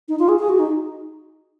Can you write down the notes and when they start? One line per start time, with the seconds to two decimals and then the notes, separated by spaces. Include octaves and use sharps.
0.09 D#4
0.19 F4
0.29 G#4
0.39 G#4
0.49 F#4
0.59 D#4